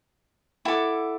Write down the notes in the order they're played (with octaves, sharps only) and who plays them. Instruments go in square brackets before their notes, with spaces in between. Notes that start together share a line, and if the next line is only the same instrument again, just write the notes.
[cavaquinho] E4 D6 [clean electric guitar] A4 F#5